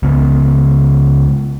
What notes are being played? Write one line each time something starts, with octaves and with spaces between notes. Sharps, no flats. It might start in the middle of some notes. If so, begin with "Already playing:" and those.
C#2 C#3 B3